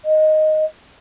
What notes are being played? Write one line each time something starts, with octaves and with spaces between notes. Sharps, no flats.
D#5